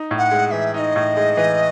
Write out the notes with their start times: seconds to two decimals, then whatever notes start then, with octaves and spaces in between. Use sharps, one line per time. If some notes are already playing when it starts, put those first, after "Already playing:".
Already playing: D#4
0.11 A2
0.18 F#5
0.31 G#3
0.47 F#5
0.51 E3 E5
0.74 D#4 D#5 E5
0.96 A2
1.17 G#3
1.37 E3